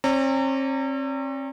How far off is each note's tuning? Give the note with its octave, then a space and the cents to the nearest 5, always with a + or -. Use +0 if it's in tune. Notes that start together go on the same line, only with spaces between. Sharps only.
C4 +45 D5 -35 A#5 -35